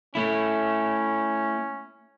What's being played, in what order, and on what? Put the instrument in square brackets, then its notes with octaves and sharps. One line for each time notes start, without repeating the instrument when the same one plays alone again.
[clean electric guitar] A3 E4 [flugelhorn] C#4